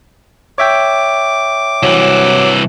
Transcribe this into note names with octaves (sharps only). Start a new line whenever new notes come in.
C#5 E5 G5 D6
C2 E3 F#3